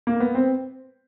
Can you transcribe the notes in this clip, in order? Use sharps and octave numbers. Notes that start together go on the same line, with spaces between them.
A#3
B3
C4